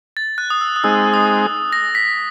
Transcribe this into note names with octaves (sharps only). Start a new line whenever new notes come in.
A6
F#6
D#6
E6
D#6
G#3 C4 D#4 G#4 E6
D#6
A#6
B6